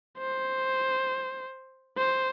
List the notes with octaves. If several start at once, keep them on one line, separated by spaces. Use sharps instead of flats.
C5
C5